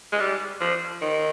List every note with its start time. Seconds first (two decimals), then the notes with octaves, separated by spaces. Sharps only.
0.12 G#3
0.20 G3
0.60 F3
1.01 D#3